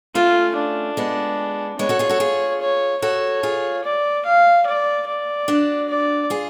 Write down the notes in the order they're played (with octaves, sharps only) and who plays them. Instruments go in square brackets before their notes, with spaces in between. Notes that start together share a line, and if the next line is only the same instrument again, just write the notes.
[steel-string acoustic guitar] A3 C#4 [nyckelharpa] F4
[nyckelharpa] D4
[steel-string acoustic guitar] G#3 B3
[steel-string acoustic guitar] G#3 B3 [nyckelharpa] C#5
[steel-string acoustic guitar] F#4 A4
F4 G#4
F#4 A4
F4 G#4
[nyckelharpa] C#5
[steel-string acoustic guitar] F#4 A4 [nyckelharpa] C#5
[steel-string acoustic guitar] F4 G#4
[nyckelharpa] D5
F5
D5
D5
[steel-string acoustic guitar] D4 F#4
[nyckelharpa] D5
[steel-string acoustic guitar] F4 G#4